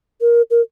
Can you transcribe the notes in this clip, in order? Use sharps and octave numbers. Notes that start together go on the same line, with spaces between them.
A#4
A#4